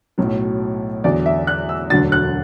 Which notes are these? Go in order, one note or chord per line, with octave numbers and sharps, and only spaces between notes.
B1 A2 F#3
E2 D3 F#3 D5
E5
F#6
E6
E1 D2 D3 F#3 A6
F#6